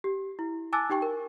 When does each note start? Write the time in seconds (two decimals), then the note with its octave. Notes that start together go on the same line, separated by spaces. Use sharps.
0.04 G4
0.39 E4
0.73 G#5 A5 D6 E6 F#6 A6
0.90 D#4 G4 G5 C#6
1.02 A#4